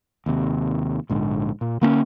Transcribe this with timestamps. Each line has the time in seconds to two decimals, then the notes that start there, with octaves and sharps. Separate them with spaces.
0.26 D#2 C3
1.10 A#1 G#2 D3
1.61 A#2
1.81 D3 A#3 B3 C#4